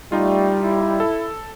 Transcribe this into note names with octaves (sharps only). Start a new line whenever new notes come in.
G3 A3 D#4 F4
E4
A4